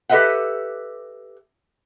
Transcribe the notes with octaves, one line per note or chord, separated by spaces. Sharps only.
G4 A4 B4 D#5 E5 F#5